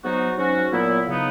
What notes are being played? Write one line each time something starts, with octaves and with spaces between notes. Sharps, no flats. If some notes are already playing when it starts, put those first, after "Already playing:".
G#2 F#3 B3 D#4 F#4
G#2 F#3 C#4 F#4
A#2 F#3 B3 E4
C#3 F#3 B3 D#4